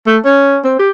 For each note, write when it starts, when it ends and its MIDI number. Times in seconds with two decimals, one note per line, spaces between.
0.06 0.18 57
0.25 0.58 61
0.64 0.77 60
0.79 0.89 67